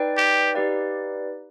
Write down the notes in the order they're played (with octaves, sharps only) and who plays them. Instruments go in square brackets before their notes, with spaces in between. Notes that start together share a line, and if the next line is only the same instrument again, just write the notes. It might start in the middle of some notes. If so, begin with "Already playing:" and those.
Already playing: [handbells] D#4 B4 D5 G5
[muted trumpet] G4
[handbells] D#4 G4 B4 D5 F5